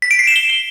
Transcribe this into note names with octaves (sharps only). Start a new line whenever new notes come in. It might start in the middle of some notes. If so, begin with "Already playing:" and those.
B6
D7
C7
E7
G7